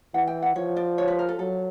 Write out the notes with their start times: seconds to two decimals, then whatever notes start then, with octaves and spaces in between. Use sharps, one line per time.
0.14 E3 F#5
0.27 G5
0.42 F#5
0.56 F3 C#5
0.76 D5
0.98 C#5
1.08 B4
1.19 A#4
1.29 A4
1.39 F#3 A4